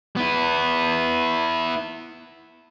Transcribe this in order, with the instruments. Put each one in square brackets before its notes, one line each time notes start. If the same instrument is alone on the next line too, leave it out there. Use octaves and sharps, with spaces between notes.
[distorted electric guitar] B3 E4